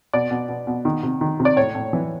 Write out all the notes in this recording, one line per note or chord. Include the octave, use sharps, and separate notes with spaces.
B2 D5
B2
B2
B2
D#3
C3
D#3
C3
D5
A2 C#5
A2
E3